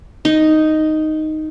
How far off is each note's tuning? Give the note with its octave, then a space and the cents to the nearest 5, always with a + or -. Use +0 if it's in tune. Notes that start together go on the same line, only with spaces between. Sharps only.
D#4 +0